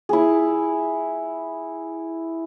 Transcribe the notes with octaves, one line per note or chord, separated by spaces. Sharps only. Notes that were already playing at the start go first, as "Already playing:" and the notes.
E4 G#4